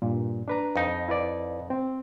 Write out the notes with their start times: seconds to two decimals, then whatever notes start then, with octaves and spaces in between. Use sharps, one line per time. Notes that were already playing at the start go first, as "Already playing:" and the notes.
0.02 G2 A#2
0.48 D4 B4 A#5
0.76 F2 D#4
1.08 E4 B4 D5
1.70 C4